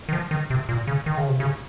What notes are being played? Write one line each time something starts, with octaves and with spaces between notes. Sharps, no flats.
D#3
F3
D#3
C3
A#2
C#3
D#3
C#3
C3
C#3